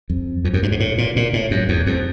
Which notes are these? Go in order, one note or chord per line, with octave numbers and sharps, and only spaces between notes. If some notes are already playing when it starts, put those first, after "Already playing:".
F2
F2
F#2
G2
G#2
A2
A#2
A#2
A2
F#2
E2
F2